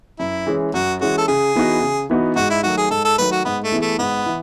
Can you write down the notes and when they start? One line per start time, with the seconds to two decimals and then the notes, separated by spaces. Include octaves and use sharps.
0.19 F#2 E4
0.47 E3 G#3 C#4 G#4
0.74 F#2 F#4
1.01 E3 G#3 C#4 F#4 G#4
1.18 A4
1.28 C#3 G#4
1.55 E3 B3 D#4 F#4
1.82 C#3
2.10 E3 B3 D#4 F#4
2.36 G#2 F#4
2.50 E4
2.63 D#3 F#3 A3 F#4
2.77 G#4
2.91 G#2 A4
3.05 A4
3.18 D#3 F#3 A3 B4
3.32 F#4
3.45 G#2 B3
3.64 A3
3.72 E3 B3 E4 G#4
3.82 A3
3.99 G#2 B3
4.26 E3